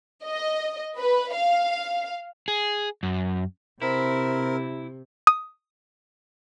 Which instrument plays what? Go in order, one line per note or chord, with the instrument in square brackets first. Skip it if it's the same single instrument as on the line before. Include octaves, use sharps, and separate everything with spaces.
[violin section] D#5
B4
F5
[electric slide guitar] G#4
F#2
[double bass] C3 [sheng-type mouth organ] C4 A#4 [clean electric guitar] E4
[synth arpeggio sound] D#6